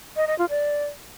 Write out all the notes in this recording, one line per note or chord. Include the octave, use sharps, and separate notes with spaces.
D#5
D#5
F4
D5